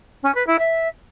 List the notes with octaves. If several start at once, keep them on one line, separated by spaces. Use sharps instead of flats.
C#4
B4
E4
E5